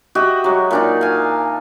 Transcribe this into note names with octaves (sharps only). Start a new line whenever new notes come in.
F#4 G4 D#5 E5
F#3 G#3
A#2 D4 D#4
F5 G#5